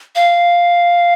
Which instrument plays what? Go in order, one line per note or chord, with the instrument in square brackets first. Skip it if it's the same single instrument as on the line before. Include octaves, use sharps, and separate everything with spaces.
[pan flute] F5